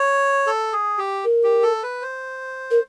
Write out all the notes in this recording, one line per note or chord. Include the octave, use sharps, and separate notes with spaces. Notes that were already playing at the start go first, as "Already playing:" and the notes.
Already playing: C#5
A4
G#4
G4
A#4
G4
A4
B4
C5
A#4